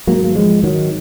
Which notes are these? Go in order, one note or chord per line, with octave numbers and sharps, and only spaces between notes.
G#1 G#2 F#3 A#3
A#3
F3 G#3
D#3 F#3